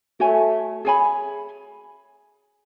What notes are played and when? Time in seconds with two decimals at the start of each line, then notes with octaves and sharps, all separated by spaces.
0.20 A3 F#4 C#5 G#5
0.85 G#4 C#5 G#5 B5